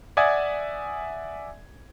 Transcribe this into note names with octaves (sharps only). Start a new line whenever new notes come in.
D5 E5 F#5 G#5 D#6 G#6